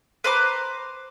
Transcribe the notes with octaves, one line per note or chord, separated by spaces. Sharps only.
B4 C5 A#5 D6